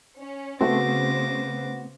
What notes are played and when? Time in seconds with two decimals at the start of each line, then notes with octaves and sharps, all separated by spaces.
0.18 C#4
0.61 C#3 A3 B3 C4 F#4 C5 D6 A#6